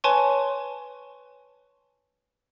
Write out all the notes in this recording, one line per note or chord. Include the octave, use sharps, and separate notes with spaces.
B4 C#5 G#5 A5 C6 C#6